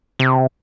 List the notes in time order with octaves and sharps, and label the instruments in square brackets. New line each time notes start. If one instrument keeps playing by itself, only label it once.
[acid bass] C3